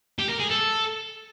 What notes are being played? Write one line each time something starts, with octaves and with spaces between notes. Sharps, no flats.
G4
A#4
G#4
A4